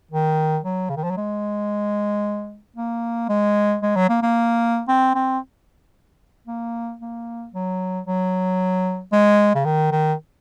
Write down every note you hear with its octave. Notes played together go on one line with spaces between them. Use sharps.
D#3
F#3
C#3
D#3
F3
F#3
G#3
A#3
G#3
G#3
F#3
A#3
A#3
C4
C4
A#3
A#3
F#3
F#3
G#3
C#3
D#3
D#3